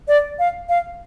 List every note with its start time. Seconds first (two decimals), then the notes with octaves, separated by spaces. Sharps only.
0.08 D5
0.39 F5
0.69 F5